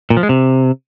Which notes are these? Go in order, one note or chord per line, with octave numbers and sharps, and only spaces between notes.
A#2
F3
G#3
C3